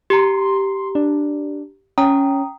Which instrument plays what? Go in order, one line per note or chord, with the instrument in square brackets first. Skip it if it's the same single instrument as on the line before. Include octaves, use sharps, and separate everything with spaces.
[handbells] G4 A#5 [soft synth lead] C6
[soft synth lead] D4
[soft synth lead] C#4 [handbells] G5 A#5 D#6